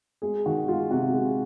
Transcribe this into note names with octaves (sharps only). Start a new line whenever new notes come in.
G#3 G#4
D#3 F#4
G#3 F4
C3 F#4
G#3 G#4